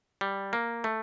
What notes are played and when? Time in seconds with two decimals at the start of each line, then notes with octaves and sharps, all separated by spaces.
0.21 G3
0.53 A#3
0.84 A3